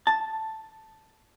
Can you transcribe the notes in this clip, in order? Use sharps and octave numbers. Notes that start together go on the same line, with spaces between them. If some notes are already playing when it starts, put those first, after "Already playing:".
A5